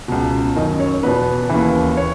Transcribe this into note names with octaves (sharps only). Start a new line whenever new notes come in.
C#2 B2
F#2 D#3 D#5
C#5
E2 B2 B4
D#2 C#3 E3
C#5